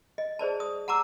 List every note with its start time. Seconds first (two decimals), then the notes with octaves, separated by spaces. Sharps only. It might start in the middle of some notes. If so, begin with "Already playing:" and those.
0.18 D#5
0.39 G#4 C5 D5 A5
0.60 D#6
0.88 F#5 A5 A#5 D6 E6